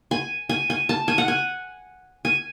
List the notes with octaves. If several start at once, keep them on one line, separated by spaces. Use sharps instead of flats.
G#5
G#5
G#5
A5
G#5
F#5
G#5
G#5